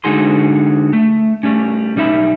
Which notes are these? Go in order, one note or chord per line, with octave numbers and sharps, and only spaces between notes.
D3 G#3 D#4 F#4 G#4 C6
A3
G3 A3 C#4
B1 G3 D#4 E5 B5